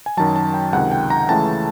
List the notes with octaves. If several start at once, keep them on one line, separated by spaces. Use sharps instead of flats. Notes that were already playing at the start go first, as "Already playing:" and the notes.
G#5
F#2 D#3 F#3 A5
A5
G5
C#2 C3 D#3 F#5
G5
A#5
C#2 C#3 E3 A3 C#4 A5